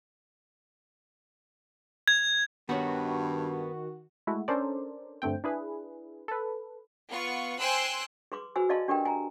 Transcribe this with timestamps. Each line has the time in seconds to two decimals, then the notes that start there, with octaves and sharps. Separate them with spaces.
2.08 G#6
2.69 G2 D#3 B3 F#4 C#5
4.27 G#3 A3 E4 F#4
4.48 C#4 D4 A4 A#4 C5 D5
5.22 G2 D3 A3 C4 G5
5.44 D4 E4 G#4 B4
6.28 A4 B4
7.09 B3 F4 C#6
7.60 C5 G5 G#5 C6 E6 F#6
8.32 G#4 B4 C6 D6
8.56 F#4 G#4 B4 C5 G#5 E6
8.69 G#4 D5 D#5 F5 A5 C6
8.88 D4 G4 G#4 A#4 B4 G5
9.05 G#5 A#5